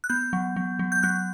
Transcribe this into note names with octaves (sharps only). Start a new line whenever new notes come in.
F#6
B3 G6
F#3
F#3
F#3
G6
F#3 F#6